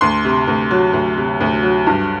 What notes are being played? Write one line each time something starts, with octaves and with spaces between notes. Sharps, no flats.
D2 C6
C3
D2
F#3
D2
C3
D2
F#3
G2